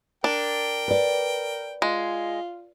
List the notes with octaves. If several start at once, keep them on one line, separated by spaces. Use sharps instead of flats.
D4 A#4 G5
B4 D5
G#3 F4